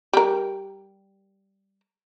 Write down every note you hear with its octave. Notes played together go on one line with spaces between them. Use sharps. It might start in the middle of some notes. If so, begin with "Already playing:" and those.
G3 A#4